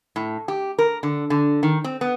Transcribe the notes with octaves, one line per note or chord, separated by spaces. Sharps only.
A2
G4
A#4
D3
D3
D#3
C4
B3